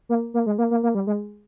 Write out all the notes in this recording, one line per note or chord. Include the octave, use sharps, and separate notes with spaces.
A#3
A#3
G#3
A#3
A#3
A#3
G3
G#3